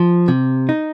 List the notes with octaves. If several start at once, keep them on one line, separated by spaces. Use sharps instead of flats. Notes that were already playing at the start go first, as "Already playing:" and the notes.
Already playing: F3
C3
D#4